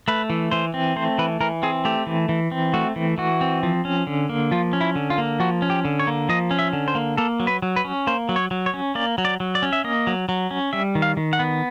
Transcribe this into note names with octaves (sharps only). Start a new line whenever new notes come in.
A3 B4
E3
E3 C5
C4
A3 C5
E3 B4
E3 A#4
C4 G#4
A3 G4
E3
E3
C4
A3 F#4
E3
E3 F#4
C4
F3
C#4
D3
A#3
F3 F4
C#4
E4
D3
F4
A#3
F3 F#4
C#4
G4
D3
C#5
A#3
F3 D#5
C#4
E5
D3
C5
A#3
A#3 A4
F#3
B4
F#3
B4
C#4
A#3 C5
F#3
C#5
F#3
C#5
C#4
A#3 D5
F#3
D5
F#3
D5
C#4
E5
A#3 D#5
F#3
F#3
C#4
G3 E5
D#3
F5
D#3
F#5
B3